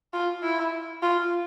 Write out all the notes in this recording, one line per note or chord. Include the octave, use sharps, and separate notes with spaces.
F4
E4
F4